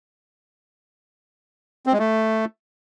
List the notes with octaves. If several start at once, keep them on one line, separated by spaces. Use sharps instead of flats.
C4
G#3
A3